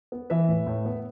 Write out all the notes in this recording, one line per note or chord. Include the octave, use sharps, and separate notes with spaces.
B3
E3 B4 E5
A2
A2
B3